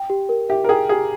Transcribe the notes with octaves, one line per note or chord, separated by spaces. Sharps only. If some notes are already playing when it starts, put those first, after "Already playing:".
Already playing: G5
G4
A#4
G4 E5
A#4
G#4 G5
G4 G#4